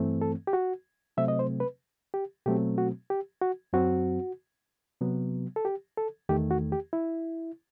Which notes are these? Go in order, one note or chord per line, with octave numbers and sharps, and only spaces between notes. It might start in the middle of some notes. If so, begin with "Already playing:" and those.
Already playing: G2 E3 A3 C4
A4
G4
F#4
C3 F#3 A3 C4 E5
D#5
C5
B4
G4
B2 F#3 A3 C4 G4
F#4
G4
F#4
F#2 F#3 C4 F#4
C3 F#3 B3
A4
G4
A4
E2 D#3 A3 G4
F#4
G4
E4